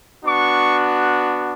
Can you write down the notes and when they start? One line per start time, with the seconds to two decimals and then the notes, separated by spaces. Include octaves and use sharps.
0.24 B3 D4 F#4 C#6